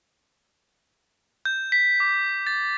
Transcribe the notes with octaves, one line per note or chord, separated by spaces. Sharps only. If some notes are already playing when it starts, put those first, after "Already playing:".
G6
B6
D6
A6